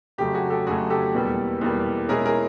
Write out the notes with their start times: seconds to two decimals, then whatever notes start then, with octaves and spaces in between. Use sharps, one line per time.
0.18 F2 C#3 F#3 A3 G4
0.34 F#4 G#4
0.50 G4 A4
0.66 F2 C#3 F#3 A3 F#4 G#4
0.90 G4 A4
1.14 E2 B2 G3 A#3
1.61 E2 B2 G3 A#3
2.09 B2 G#3 C#4 E4 G#4 A#4
2.26 G#4 A#4